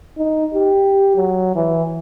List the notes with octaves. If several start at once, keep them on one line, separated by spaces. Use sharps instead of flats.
D#4
G4
F#3
E3